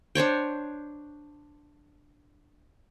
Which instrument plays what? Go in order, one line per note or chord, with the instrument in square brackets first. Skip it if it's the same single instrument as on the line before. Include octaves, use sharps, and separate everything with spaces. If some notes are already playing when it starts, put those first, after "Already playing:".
[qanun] D4 C5 C#5 G5